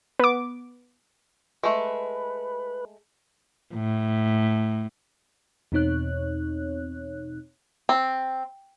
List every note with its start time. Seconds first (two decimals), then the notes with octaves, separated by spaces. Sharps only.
0.19 B3 D6
1.63 G#3 A3 B4
3.74 A2
5.72 E2 B2 C4 D#4 C#5 F#6
7.89 C4